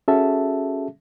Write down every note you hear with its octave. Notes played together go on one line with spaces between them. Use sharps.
C#4 F#4 G#4 A4 E5 A5